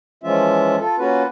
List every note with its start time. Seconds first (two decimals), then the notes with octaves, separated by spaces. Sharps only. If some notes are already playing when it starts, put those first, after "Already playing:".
0.24 E3 F3 G#3 C#4 F4 E5
0.79 F4 A4
0.99 A#3 C#4 F4 F#4 B4